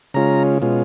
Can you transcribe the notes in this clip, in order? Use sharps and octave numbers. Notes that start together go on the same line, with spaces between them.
C#3 G#3 C#4 F4 A#5
B2 G#3 C#4 F4